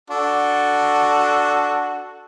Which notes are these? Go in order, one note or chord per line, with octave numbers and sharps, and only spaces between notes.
D4 F#4 A4